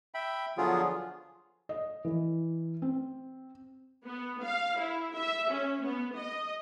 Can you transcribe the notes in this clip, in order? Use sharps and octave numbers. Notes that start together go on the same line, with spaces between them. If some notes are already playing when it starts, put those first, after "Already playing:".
E5 G5 B5
D3 F3 F#3 B3 F4 G#4
D#5
E3
C4
B3
F5
E4
E5
C#4
B3
D#5